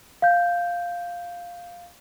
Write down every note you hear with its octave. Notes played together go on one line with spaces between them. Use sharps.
F5 G6